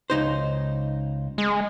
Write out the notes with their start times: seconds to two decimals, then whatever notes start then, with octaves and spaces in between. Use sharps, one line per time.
0.10 C#2 D#4 C5
1.38 G#3